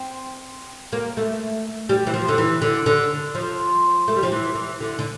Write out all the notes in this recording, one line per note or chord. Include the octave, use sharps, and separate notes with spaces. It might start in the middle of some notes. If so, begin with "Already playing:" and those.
Already playing: C4
A#3
A3
G3
E3
F3
D3
E3
D3
D3
F3
A3
G3
F3
E3
E3
D3
D3